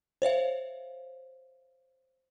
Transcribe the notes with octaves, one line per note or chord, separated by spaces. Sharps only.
C5 C#5 E5 F5